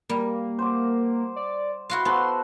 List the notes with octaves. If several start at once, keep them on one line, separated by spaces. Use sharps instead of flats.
G3 A#3
C5 F#5 D6
D5
E4 F#4 F5 C6
B3 F#4 A4 C5